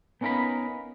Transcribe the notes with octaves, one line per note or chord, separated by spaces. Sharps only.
B3 C#4 D#4 A#4 F5 B5